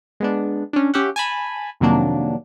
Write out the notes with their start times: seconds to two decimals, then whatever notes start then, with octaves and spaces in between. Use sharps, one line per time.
0.20 G#3 B3 D4
0.73 C#4 D4
0.94 C#4 G4 E5 F#5
1.16 G#5 A5 B5
1.80 F2 C3 D#3 F#3 A#3 D4